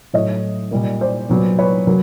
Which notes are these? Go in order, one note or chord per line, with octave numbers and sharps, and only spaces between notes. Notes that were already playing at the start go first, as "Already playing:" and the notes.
A2 F#3 A3 C#5 D#5
A#2 G3 A#3
C5 D5
A#2 F#3 B3
B4 C#5
F#3 A#3